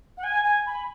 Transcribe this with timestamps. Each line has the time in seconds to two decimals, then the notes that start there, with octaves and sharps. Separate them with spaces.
0.18 F#5
0.24 G#5
0.44 G#5
0.66 B5